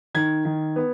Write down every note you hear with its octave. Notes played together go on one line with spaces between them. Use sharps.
D#3 G#6
D#3
B3